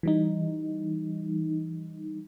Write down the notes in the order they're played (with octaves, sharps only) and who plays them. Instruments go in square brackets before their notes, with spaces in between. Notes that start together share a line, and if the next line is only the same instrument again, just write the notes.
[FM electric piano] E3 G3 D#4